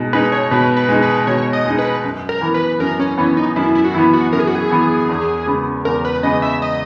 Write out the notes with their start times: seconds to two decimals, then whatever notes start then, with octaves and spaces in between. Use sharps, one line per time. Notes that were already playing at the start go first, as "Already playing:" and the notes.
Already playing: B2 G#3 D#4
0.13 G#3 D#4 B4
0.32 C#5
0.51 B2 B4
0.77 B4
0.89 G#3 D#4
1.02 B4
1.27 B2 C#5
1.53 D#5
1.66 G#3 D#4
1.78 B4
2.04 F#2
2.29 A#4
2.41 E3 B3
2.54 B4
2.80 F#2 A#4
2.99 C#4
3.18 E3 B3 C#4
3.37 D#4
3.56 F#2 E4
3.75 E4
3.85 F#4
3.94 E3 B3 E4
4.13 F#4
4.33 F#2 A#4
4.39 G#4
4.47 F#4
4.55 G#4
4.70 E3 B3
5.09 E2
5.47 C#3 G#3 B3
5.85 E2 A#4
6.05 B4
6.23 C#3 G#3 B3 D#5
6.42 E5
6.62 D#5